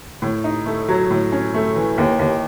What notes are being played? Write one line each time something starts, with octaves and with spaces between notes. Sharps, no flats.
A2
D#4
A3
F#3
A2
C#4
A3
E3
D#2
D#2